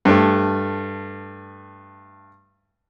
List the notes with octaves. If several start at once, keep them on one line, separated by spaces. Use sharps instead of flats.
G2 A3